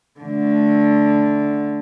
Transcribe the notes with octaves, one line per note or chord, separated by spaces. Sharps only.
D3 A3